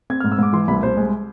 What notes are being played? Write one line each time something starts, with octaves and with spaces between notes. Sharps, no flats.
C4 G#6
F6
G#2
E6
G#2 D6
E3 C6
C2 B5
C2 C5
G#3